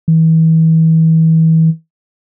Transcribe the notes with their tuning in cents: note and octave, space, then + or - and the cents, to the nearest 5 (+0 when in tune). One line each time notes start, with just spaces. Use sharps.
E3 -35